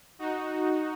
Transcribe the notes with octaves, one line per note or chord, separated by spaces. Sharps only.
D#4 F#4